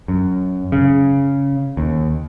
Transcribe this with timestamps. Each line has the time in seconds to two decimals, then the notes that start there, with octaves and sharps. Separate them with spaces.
0.08 F#2
0.72 C#3
1.77 D#2